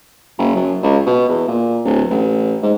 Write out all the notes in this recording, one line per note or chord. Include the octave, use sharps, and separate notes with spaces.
F#1
F#2
C#2
B2
E2
A#2
D1
A1
G#2